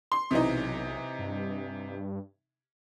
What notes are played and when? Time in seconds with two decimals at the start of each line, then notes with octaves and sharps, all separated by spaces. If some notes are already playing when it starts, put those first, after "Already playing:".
0.12 C6
0.31 B1 C3 E3 D#4
1.19 G2